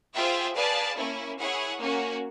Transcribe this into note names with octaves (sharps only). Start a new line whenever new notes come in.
F4 G#4 C5 E5 G5
G#4 B4 D5 F5 A5
A#3 C#4 E4
E4 G#4 C#5 F#5
A#3 C#4 F#4